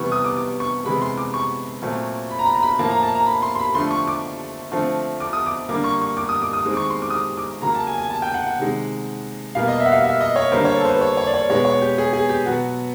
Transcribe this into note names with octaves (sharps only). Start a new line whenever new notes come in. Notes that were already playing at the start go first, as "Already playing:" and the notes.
Already playing: C3 E3 G3 B3 C#6
D#6
D6
D6
C#6
C3 E3 G#3 B3 B5
C6
D6
C#6
A#2 F#3 A3 C4
B5
A#5
B5
A#5
B5
A2 F3 A#3 A5
A#5
A5
A#5
B5
C6
C6
B5
D3 F3 A3 C6
C#6
D6
D3 F3 A3 C4
D6
D#6
D6
D3 G3 A#3 D6
C#6
C#6
D6
D#6
D6
D#6
D#3 G#3 C4
D6
C#6
C6
D6
D#6
D6
D6
C#3 F#3 A#3 A#5
A5
G#5
G#5
A5
G5
F#5
F#5
C3 D#3 G#3
B2 G3 A#3 F5
D#5
E5
F#5
F5
E5
D#5
C#5
D3 G3 A#3 C5
C#5
A4
C5
B4
C#5
C#5
D5
C#5
B2 G#3 B3 C#5
C#5
G4
G#4
G#4
G4
B2 F#3 B3 F#4